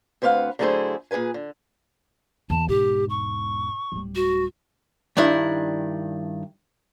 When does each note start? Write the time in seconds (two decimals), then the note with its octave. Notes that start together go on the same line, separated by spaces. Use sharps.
0.22 D2 C4 B4 D5 F5 F#5
0.59 D3 F#3 A3 E4 G#4 C5
1.11 A#2 G#4 A#4 B4 G#5
1.34 D3
2.50 E2 A5
2.69 E1 G#2 G4
3.09 C#6
3.92 D1 G3
4.15 F#4
5.17 G2 D#3 D4 E4